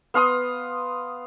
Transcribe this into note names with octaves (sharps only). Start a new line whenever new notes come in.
B3 F5 C6 D#6